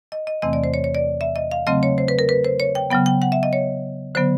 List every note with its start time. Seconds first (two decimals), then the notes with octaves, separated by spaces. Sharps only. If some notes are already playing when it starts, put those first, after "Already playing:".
0.12 D#5
0.27 D#5
0.42 E2 C3 E3 A3 C4 D#5
0.53 D5
0.64 C5
0.74 C#5
0.84 C#5
0.95 D5
1.21 E5
1.36 D#5
1.51 F5
1.67 C#3 F#3 A3 C4 D#5
1.83 C#5
1.98 C5
2.08 B4
2.19 A#4
2.29 B4
2.45 C5
2.60 C#5
2.75 G5
2.90 C#3 F#3 B3 G5
3.06 G5
3.22 F#5
3.32 E5
3.43 D#5
3.53 C#5
4.15 D3 F#3 B3 C5